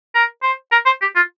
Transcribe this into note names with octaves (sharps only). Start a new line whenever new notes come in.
A#4
C5
A#4
C5
G4
F4